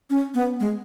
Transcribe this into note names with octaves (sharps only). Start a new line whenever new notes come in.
C#4
B3
G#3